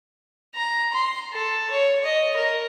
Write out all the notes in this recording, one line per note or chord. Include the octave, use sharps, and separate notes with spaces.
A#5
C6
A4
C#5
D#5
A#4